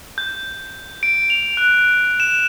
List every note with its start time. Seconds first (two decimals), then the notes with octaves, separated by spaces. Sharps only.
0.18 G6
1.03 D7
1.30 F7
1.57 F#6
2.20 E7